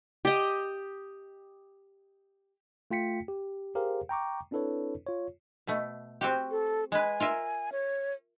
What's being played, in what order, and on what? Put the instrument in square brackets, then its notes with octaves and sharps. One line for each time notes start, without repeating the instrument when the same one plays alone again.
[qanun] G4 D#5
[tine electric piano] A3 F4 G5 B6 C#7
G4
G4 G#4 A#4 C5 F5
G5 A#5 C#6 D6
C4 D4 E4 A4 B4 C#5
F4 C#5
[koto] B2 A3
C4 F#4 G4
[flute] A4
[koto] G#3 B4 [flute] G#5
[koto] F4 A#4 E5
[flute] C#5